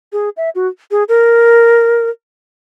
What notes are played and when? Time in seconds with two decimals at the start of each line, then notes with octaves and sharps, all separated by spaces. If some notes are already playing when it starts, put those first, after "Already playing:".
0.13 G#4
0.37 E5
0.55 F#4
0.91 G#4
1.09 A#4